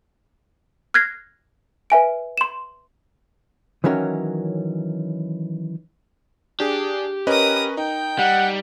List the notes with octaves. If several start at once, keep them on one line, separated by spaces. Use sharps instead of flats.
F6 F#6 G#6 A#6 C7
B4 E5 G#5 D7
C6 E7
D#3 E3 F#3 C#4 A#4
D4 G4 G#4
C#4 A#4 B4 D#5 D#6
D#4 G5
G3 F#5